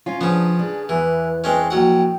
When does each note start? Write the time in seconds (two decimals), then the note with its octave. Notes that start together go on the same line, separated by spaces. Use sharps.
0.06 C#4 F4
0.21 C#3 F3 B3 D4
0.59 D4 G#4
0.89 E2 E3 B4
1.44 G#3 C4 C#4 B4
1.70 A#1 F#3 F#5 G5